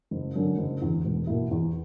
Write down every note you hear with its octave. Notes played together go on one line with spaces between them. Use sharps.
F#1
F#2 D3
F#1
E2 D3
E1
E2 B2 A#3 E4
E2